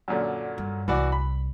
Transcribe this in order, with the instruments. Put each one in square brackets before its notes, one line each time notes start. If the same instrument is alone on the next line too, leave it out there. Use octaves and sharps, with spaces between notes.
[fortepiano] F#2 A#2 D3
[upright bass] G2
[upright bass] C2 [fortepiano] E3 F#4 D5
[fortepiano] B5